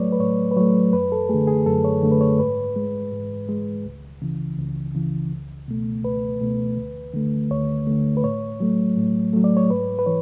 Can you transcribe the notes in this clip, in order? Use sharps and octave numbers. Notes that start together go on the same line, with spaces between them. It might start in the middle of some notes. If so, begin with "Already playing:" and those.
Already playing: A2 F#3 A3 B4 C#5 D5
B4
A2 C#5
B4
F#3 A3 C#5
F#2 B4
A4
D3 A3 G#4
G#4
F#2 A4
C#5
D3 A3
B4
C#5
G#2 B4
G#3
G#2
G#3
C#2
C#3 E3
C#2
C#3 E3
C#2
B2 A3
C#2 B4
B2 A3
D2
D3 A3
D2 C#5
D3 A3
B4
A2 C#5
F#3 A3
A2
F#3 A3
D5
C#5
G#2 B4
B4
E3 C#5